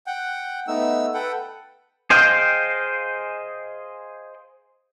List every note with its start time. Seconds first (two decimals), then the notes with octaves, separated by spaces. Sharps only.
0.07 F#5 G5
0.68 A3 B3 D#4 E6
1.14 A4 B4 F#5 G5
2.10 G#4 C5 D#5 F5 G5